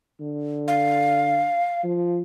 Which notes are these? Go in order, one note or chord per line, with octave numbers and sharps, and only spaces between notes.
D3
F5
F3